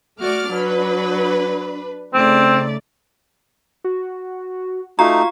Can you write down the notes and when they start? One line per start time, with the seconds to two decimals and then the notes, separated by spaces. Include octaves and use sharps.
0.21 A3 F#4 D5 D6 F6
0.51 F#3 D4 B4
2.14 C#3 A3 C4 D#4 D5
3.84 F#4
4.99 A3 D#4 F4 F#4 F5 A#5 C#6